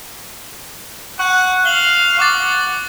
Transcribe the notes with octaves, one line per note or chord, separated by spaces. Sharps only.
F#5 C#6 F#6
F5 F#7 G7
F#5 C#6 D6 A6